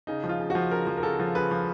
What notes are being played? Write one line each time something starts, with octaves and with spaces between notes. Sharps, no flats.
C#3 D#4
F3
F4
C#3
F#4
F3
C#3 A#4
F3
A#4
C#3 A4
F3
C#3 B4
F3